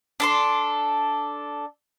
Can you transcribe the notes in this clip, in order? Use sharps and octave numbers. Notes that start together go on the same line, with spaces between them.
D4 A4 C6